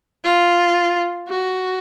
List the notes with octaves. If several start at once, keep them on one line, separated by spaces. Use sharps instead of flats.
F4
F#4